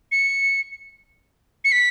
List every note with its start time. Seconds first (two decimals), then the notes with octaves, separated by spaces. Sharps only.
0.12 C#7
1.65 C#7
1.72 B6